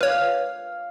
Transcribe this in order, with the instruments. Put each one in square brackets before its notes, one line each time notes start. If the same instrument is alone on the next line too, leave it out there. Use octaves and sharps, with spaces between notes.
[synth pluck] B4 C#5 [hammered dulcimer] F5